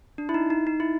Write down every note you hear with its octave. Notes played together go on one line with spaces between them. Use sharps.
D4
E4
D#4
D#4
D#4
E4